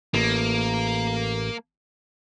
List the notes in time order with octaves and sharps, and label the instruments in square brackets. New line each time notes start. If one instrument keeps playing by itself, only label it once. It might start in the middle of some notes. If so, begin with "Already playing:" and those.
[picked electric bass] A1 [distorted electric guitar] A#3